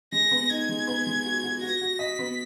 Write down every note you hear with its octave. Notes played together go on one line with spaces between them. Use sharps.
G#3 A#6
B3
D#4 G#6
G#3
B3
G#3
F#4
F#4
F#4 A#6
F#4
D#5 B6
B3